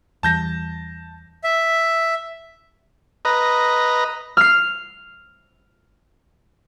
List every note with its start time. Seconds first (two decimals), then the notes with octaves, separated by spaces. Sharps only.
0.23 E2 E3 G3 A5 G6 A#6
1.44 E5
3.25 B4 D#5 A#5
4.37 F6 C7